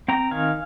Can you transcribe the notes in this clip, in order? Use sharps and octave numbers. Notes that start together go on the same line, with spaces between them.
C4 G5 A#5
D#3 F5 G#5